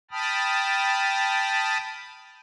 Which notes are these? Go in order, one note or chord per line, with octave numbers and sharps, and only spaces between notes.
G5 A5 B5 D#6 F6